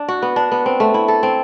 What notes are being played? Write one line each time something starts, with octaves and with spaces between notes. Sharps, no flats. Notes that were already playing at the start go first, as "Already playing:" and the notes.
Already playing: D4
F#4
B3
D4
B3
C4
A3
E4
A4
C4